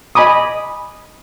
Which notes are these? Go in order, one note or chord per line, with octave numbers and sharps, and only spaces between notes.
D#5 G#5 B5 D6 D#6